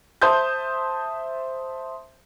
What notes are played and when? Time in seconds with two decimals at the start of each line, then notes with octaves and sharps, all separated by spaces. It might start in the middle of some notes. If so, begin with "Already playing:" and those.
0.22 C5 E5 A5 C6 D#6 G6